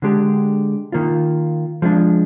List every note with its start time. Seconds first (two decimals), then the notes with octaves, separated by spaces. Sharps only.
0.02 D3 G#3 D4 G4
0.92 D#3 A#3 F4
1.82 F3 G#3 D4